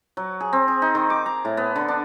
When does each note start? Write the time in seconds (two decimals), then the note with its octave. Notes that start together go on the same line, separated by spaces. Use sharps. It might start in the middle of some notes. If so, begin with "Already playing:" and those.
0.17 F#3
0.40 G#4
0.53 C4
0.68 G#4
0.82 D#4
0.95 D#3
1.10 D6
1.26 A#5
1.45 A2
1.57 B3
1.76 D3
1.88 D4